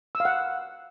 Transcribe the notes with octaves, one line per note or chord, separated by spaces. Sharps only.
E6
F5
F#5